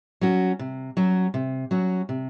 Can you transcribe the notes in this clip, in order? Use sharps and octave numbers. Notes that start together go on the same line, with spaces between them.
F#3 C#4 F#4
C3
F#3 C#4 F#4
C3
F#3 C#4 F#4
C3